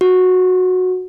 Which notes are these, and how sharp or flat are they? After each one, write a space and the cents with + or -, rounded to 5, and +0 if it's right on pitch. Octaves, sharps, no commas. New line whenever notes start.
F#4 -10